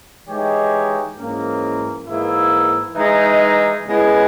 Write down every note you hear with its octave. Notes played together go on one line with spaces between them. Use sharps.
E3 G#3 D#4 G4 C#5
G#2 E3 A#3 C#4
G#2 E3 A#3 E4
E3 G#3 D#4
C#3 G#3 B3 E4